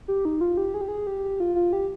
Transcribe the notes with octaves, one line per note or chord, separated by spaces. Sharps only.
G4
D#4
F4
G4
G#4
G4
G#4
G4
F4
F4
G4